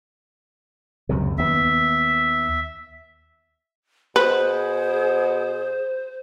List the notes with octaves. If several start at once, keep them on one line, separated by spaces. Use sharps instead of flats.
C#2 F#2 C3
D#2 B3 E5
B2 G#4 B4 C5